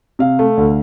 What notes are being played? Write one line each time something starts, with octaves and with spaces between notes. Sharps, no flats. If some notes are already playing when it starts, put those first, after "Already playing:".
C3 F5
A3
D2